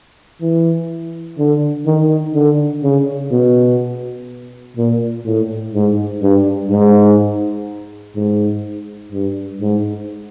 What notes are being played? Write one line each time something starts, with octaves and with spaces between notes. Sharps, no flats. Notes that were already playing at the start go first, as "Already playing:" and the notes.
E3
D3
D#3
D3
C#3
B2
A#2
A2
G#2
G2
G#2
G#2
G2
G#2